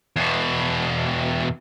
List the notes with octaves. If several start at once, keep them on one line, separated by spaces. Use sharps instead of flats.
E2 B2